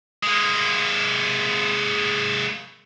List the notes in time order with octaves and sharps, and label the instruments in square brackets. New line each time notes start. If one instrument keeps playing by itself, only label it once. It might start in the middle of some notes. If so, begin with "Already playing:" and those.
[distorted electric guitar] G#3 A#3